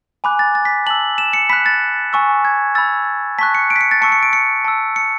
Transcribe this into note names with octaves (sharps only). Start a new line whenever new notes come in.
G#5 B5 D6 F#6
A6
A6
B6
A5 E6 F#7
E7
C#7
B5 F#6 B6
A6
G#5 C#6 E6
G#6
B5 E6 A6
A5 C#6 F#6 B6
C#7
D7
B6
C#7
A6
A5 C#6 E6 C#7
C#7
D7
C#7
A5 E6
C#7